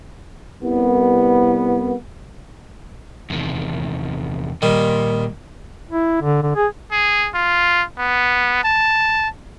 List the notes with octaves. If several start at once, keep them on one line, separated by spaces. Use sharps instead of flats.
C2 B3
E2 C3 D#3
A#2 D#3 G3
E4
D3
D3
G#4
G#4
F4
B3
A5